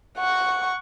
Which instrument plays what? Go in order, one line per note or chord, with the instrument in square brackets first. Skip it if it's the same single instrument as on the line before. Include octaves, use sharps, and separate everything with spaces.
[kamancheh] F#5 C#6